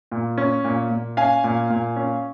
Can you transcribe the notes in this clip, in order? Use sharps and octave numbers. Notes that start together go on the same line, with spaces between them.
A#2
C#4
A#2
A#2
C#4 F5 G#5
A#2
A#2
C#4